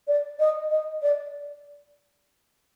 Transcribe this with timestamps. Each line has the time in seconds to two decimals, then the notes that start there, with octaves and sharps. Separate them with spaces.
0.08 D5
0.40 D#5
0.71 D#5
1.02 D5